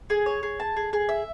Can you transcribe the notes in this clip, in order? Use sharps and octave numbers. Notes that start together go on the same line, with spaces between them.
G#4
C#5
G#4
A5
G#4
G#4
E5